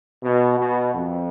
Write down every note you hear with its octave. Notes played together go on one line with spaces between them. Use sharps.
B2
B2
F2